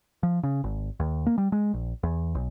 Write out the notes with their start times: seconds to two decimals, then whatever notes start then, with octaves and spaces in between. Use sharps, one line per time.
0.23 F3
0.43 C#3
0.64 G#1
1.00 D#2
1.26 A#3
1.38 G3
1.52 G#3
1.74 A#1
2.03 E2
2.35 B1